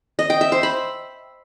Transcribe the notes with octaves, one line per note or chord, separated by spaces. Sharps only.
D#5
G5
E5
C5
B5